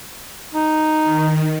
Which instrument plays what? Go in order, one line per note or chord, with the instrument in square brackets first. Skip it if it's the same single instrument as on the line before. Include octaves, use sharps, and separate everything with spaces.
[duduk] D#4
[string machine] D#3